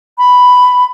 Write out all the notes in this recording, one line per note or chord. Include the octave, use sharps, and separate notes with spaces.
B5